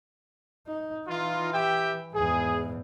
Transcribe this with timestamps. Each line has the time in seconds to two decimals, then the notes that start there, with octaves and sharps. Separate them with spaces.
0.67 D#4
1.08 E3 D#4 F4
1.53 G4 E5 G5
2.14 E2 G#2 G#4